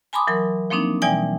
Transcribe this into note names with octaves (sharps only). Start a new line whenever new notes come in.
G#5 A5 B5 C6 D6 D#6
E3 F#3 A#4
F3 A#3 C4 D4 D#4
B2 E3 G3 D5 G5 G#5